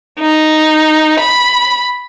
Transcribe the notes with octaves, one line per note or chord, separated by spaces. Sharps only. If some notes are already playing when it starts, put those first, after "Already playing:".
D#4
B5